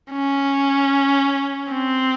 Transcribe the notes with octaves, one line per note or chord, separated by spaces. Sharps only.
C#4
C4